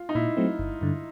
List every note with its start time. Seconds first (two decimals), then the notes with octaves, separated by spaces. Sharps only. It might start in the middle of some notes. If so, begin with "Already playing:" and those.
Already playing: F4
0.09 D#4
0.15 A#2 E4
0.37 F#3 A3 C4
0.59 G1
0.81 G2 D3